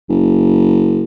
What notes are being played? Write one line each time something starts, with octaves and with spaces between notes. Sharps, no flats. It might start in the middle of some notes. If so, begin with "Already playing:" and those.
F#1